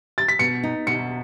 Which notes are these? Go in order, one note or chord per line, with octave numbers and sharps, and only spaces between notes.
A6
B6
B2 C#7
D#4
B2 C#7